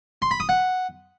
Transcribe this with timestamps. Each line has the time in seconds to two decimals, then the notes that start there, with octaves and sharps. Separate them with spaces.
0.22 C6
0.31 B5
0.40 D#6
0.49 F#5